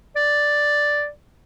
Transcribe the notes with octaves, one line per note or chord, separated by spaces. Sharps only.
D5